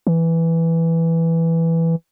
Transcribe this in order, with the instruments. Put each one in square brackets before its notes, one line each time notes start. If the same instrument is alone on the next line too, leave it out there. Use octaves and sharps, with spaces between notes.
[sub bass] E3